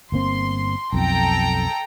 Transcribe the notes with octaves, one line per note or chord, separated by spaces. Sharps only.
G1 A#3 C4 C6
B1 F2 A4 G5 A#5